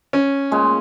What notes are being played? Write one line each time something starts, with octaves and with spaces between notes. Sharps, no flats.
C#4
A#2 G#3